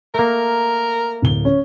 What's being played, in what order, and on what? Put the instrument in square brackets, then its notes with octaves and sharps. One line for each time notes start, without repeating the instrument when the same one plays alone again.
[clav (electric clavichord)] A3 A#3 [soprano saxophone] A#4
[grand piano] D1 G7
C#4